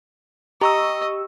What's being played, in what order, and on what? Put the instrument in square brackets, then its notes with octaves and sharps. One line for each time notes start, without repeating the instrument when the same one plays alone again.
[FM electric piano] G4 C#6 E6 [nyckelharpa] D#5 [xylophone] A#5